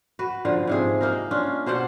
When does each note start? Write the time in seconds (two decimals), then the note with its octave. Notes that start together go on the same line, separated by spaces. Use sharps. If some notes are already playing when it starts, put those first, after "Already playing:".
0.19 F#4 B4
0.45 A#2 D3 F3
0.67 G#2 C3 G#4
1.01 A#3 D#4 A#4
1.31 C#4 D4 F4
1.66 B2 C5 D5 F#5